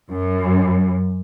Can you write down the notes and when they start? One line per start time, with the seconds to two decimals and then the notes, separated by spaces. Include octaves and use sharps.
0.10 F#2